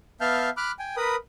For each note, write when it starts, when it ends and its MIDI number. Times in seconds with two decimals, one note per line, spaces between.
0.21 0.50 59
0.21 0.50 76
0.21 0.50 77
0.21 0.50 81
0.21 0.50 89
0.21 0.50 91
0.57 0.72 83
0.57 0.72 86
0.57 0.72 89
0.57 0.72 90
0.79 0.96 79
0.79 0.96 80
0.97 1.16 70
0.97 1.16 71
0.97 1.16 83
0.97 1.16 87